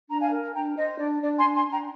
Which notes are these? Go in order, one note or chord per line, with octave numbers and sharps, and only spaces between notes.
D4 A#5
F5 G#5
A#4
D4 G5 A#5
C5 D#5
D4 D5
D4 D5
G#5 C6
D4
G#5 C6
D4
G5 A#5